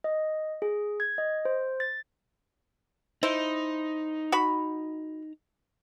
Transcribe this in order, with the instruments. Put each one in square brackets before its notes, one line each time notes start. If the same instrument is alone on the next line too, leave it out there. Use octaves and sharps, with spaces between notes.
[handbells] D#5
G#4
G#6
D#5
C5
A6
[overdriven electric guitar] D#4 [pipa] E4 C5
[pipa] F#4 B5